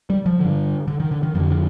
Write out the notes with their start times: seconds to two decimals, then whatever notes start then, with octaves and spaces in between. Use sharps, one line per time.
0.10 G3
0.26 F3
0.41 G2 D3
0.88 D3
1.00 D#3
1.11 D3
1.23 D#3
1.34 F2 F3
1.39 D3
1.51 F3